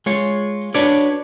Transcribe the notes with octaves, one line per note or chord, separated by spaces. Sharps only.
G#3 F4 C#5
D4 F#4 B4 C#5 D5